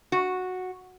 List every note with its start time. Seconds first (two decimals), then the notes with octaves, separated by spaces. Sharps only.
0.12 F#4